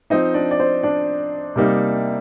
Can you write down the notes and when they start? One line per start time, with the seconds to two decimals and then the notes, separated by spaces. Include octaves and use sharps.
0.10 F3 C4 D#4 D#5
0.34 D4 D5
0.51 D5
0.60 C4 C5
0.83 D4 D5
1.56 C3 G3 A#3 D#4